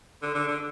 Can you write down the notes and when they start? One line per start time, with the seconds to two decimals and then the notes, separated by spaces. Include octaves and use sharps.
0.22 D3
0.35 D3
0.48 D3